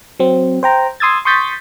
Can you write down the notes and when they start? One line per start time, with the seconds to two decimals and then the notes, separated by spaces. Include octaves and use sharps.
0.19 F#3 C4
0.63 C5 G5 A#5
1.00 C6 D#6 E6 G#6 A6
1.25 C6 C#6 D#6 G6 A6 B6